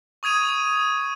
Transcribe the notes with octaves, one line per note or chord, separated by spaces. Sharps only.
C#6 D#6 G#6 D#7 F7